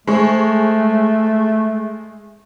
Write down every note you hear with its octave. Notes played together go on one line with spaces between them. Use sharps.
G#3 A3 C5 C#6